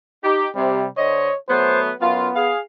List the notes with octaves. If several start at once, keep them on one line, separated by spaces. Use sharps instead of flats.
D#4 G4
C3 G3
D3 C5 C#5 D#5
F#3 A3 B3 C5
F#2 B3 F4
G#4 F5